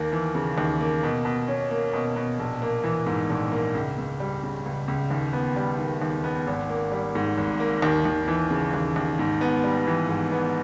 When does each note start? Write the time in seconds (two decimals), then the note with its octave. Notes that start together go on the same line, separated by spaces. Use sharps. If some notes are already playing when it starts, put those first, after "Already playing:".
Already playing: D#2 A#3
0.12 E3
0.35 C#3
0.58 D#2
0.80 A#3
1.03 B2
1.25 B2
1.48 C#4
1.71 A#3
1.93 B2
2.16 B2
2.40 A#1
2.62 A#3
2.84 E3
3.06 G#2
3.30 A#1
3.52 A#3
3.75 C#2
3.98 C#2
4.20 G3
4.43 C#3
4.66 C#2
4.88 C#2
5.11 D#2
5.33 B3
5.56 G3
5.79 D#3
6.02 D#2
6.24 B3
6.47 G#1
6.69 A#3
6.92 G3
7.15 G#2
7.37 G#1
7.60 A#3
7.82 D#2
8.05 D#2
8.28 E3
8.51 C#3
8.74 D#2
8.96 D#2
9.19 G#2
9.41 B3
9.64 G3
9.87 E3
10.09 G#2
10.32 B3